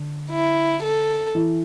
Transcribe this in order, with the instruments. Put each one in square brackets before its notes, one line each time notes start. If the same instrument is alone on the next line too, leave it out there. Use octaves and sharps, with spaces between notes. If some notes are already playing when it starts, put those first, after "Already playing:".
Already playing: [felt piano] D3
[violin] E4
A4
[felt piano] E3